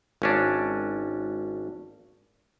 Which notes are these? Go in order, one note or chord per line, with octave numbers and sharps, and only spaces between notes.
G#1 C#4 D4